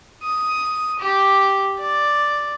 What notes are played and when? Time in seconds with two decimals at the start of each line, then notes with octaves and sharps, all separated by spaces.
0.23 D#6
1.00 G4
1.80 D5